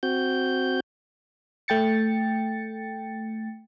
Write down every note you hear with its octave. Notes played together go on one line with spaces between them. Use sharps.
C4 F#4 G6
A3 G5 A6 C#7